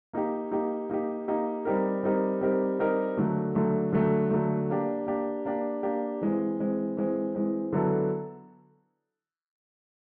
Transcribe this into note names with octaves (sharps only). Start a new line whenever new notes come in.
A#3 D#4 G4
A#3 D#4 G4
A#3 D#4 G4
A#3 D#4 G4
G3 C4 D#4 G4 A#4
G3 C4 D#4 G4 A#4
G3 C4 D#4 G4 A#4
G3 C4 D#4 G4 A#4
D3 F#3 A3
D3 F#3 A3
D3 F#3 A3
D3 F#3 A3
A#3 D4 G4
A#3 D4 G4
A#3 D4 G4
A#3 D4 G4
E3 G#3 C4
E3 G#3 C4
E3 G#3 C4
E3 G#3 C4
D3 F#3 B3 E4 A4